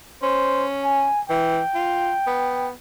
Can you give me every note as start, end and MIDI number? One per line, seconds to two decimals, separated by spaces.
0.23 1.07 61
0.23 0.65 72
0.84 1.20 80
1.30 1.60 52
1.30 2.70 79
1.75 2.12 65
2.27 2.71 59